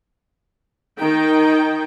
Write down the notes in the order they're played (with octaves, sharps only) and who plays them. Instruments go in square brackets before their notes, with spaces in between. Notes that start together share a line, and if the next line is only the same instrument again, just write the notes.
[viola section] D#3 G5 [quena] D#4